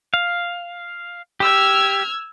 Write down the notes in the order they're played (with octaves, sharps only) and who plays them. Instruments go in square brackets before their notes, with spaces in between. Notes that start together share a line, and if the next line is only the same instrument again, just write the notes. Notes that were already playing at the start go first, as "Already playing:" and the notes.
[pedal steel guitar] F5
[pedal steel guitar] G4 [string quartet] E6 F6 G#6